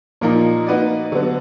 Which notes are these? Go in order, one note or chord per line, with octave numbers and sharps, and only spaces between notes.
A#2 F3 A#3 D#4 A#4
A#3 D#4 F#4 B4 D5
D3 F#3 B3